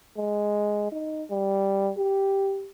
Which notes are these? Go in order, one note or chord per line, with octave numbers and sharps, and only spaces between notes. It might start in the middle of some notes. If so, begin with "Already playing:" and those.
G#3
D#4
G3
G4